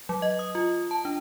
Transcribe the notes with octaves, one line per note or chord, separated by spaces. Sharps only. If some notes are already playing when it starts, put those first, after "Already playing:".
F#3
D#5
D#6
F4
A5
D4